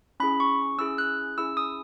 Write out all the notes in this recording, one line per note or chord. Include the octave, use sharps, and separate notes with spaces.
C#4 E4 G#4 B5
C#6
C#4 E4 G#4 E6
F#6
C#4 E4 G#4 E6
D#6